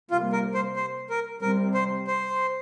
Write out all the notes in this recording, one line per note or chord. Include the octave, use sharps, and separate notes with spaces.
C3 G3 A#3 F4
A#4
C5
C5
A#4
C3 G3 C4 A#4
C5
C5